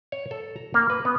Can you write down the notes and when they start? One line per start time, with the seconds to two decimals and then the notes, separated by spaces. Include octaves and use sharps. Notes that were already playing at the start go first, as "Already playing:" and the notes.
0.12 C#5
0.31 A4
0.56 A#5
0.74 A#3
0.90 B4
1.05 B3